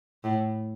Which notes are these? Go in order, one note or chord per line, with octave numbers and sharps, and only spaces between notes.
A2